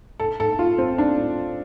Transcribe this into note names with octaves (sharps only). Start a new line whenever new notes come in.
A4
A4
F4
C4
D4